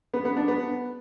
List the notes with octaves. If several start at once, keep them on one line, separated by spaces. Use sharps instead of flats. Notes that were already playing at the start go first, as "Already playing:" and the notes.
B3
B3
D4
B3